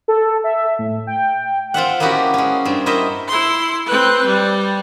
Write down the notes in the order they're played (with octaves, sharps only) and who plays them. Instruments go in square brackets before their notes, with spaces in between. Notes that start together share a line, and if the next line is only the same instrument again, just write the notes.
[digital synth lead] A4
E5
A2
G5
[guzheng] C4 F4 E5 F#5
A#3 B3 C#4 E4 F#4 G4
G#3 C#4
G2 C4
E4 A#4 C5 C#5 D#5 E5
[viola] E4 C6
C4 B4
G3